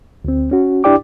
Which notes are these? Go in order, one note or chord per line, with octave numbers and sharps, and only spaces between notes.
D2 C4
C#4 F#4
D4 E4 G4 D5 G5 D6